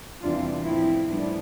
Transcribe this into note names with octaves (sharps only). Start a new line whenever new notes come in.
E2 C3 E3 G3 D4 F4
A2 F3 C4 E4
A2 E3 G3 B3 D4